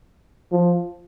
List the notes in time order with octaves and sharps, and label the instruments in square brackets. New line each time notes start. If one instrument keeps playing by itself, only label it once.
[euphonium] F3